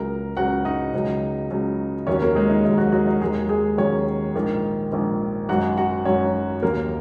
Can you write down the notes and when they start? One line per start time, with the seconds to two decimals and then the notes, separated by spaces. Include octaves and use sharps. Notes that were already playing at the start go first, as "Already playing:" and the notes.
Already playing: C#2 C#3 F#3 A#4 A#5
0.37 C#2 C#3 F#3 F#4 F#5
0.65 D#4 D#5
0.94 C#2 C#3 F#3
1.51 C#2 C#3 F#3
2.07 D#2 D#3 F#3 C#4 C#5
2.22 A#3 A#4
2.35 G#3 G#4
2.49 D#4
2.64 D#2 D#3 F#3 D#4
2.78 F#3 F#4
2.92 F#3 F#4
3.07 D#4
3.21 D#2 D#3 F#3 G#3 G#4
3.49 G#3 G#4
3.77 D#2 D#3 F#3 C#4 C#5
4.35 A#1 G#2 D#3
4.92 A#1 G#2 D#3
5.49 G#1 F#2 F#3 F#4 F#5
5.77 F#4 F#5
6.05 G#1 F#2 F#3 C#4 C#5
6.62 D#2 D#3 F#3 A#3 A#4